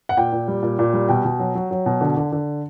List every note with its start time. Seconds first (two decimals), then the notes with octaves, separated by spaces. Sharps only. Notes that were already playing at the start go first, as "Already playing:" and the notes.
0.09 F#5
0.17 A#2 G5
0.32 A#2
0.48 G3
0.63 A#2
0.79 A#2
0.93 G3
1.09 B2 G5
1.25 B2
1.39 F#3
1.55 F#3
1.71 F#3
1.86 B2
2.01 D3
2.17 D3
2.32 D3